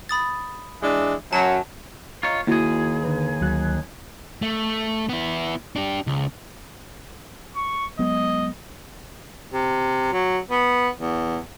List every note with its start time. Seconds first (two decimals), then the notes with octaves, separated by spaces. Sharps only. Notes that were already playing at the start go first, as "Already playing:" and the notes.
0.09 B5 D#6 A6
0.83 E3 G#3 D4
1.33 F#2 F#3 A5
2.23 F4 C#5 D#5 A#5
2.47 D#2 A#3 E4 F#4 G#4
3.04 D3 D#3 B4
3.41 D2 F#3 F#6
4.42 A3
5.09 B3 E4
5.76 D4 G4
6.07 C#2
7.56 C#6
7.99 F#3 G#3 B3 D#5
9.53 C3
10.13 F#3
10.51 B3
11.00 E2